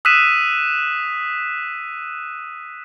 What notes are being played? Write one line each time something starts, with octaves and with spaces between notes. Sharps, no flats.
D#6 E6 F#6 B6 D#7 E7